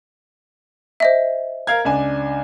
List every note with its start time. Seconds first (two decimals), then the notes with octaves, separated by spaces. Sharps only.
1.00 C5 D#5 E5
1.67 A#4 F5 G#6
1.85 C#2 D4 G#5